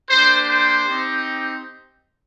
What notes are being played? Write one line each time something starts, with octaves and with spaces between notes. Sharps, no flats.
A#3 D4 G4 C5
C5
C4 D#4 G4